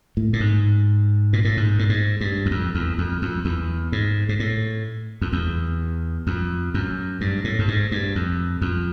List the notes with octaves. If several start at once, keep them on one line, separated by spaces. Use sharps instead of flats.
A2
A2
G#2
A#2
A2
G#2
A2
G#2
G2
E2
F2
E2
F2
F2
E2
G#2
G#2
A2
F2
E2
F2
F#2
G2
A2
G2
G#2
G2
F2
F2